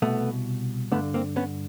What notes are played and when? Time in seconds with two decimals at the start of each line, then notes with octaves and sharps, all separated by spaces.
0.02 C2 B2 A3 B3
0.92 G2 D3 A3 B3
1.14 A#3 C4
1.36 B3 C#4